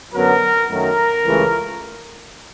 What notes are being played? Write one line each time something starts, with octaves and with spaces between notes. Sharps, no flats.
F#2 D3 F#3 B3 A#4
F#2 D#3 F#3 A3 A#4
C#2 C#3 E3 A3